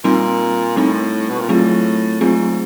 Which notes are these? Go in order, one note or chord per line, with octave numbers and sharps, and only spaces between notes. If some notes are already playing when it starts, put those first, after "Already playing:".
A#2 G3 C4 D#4
A2 G3 C4 D#4
B2
A#2
A2 F#3 A3 C4 F4 G#4
G#2 F#3 A3 C4 F4 G#4